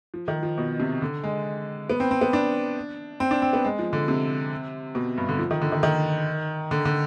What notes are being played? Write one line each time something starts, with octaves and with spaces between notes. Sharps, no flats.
F3
D#3
F3
B2
C3
D3
G#3
B3
C4
C4
B3
D4
C4
D4
C4
B3
G#3
F3
D3
C3
B2
G2
D3
F3
D#3
D3
D#3
D#3
D3
D3